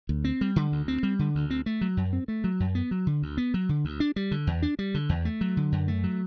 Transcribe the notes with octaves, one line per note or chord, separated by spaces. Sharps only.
D2
C4
G3
D3
D2
C4
G3
D3
D2
C4
A3
F#3
F#2
C4
A3
F#3
F#2
B3
F#3
D3
D2
B3
F#3
D3
D2
D4
G3
D3
E2
D4
G3
D3
E2
A3
F#3
D3
F#2
A3
F#3